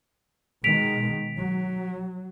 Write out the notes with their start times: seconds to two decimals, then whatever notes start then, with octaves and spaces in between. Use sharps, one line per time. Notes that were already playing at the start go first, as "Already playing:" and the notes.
0.64 B2 D#3 G#3 B6 D7 F7
1.36 F#3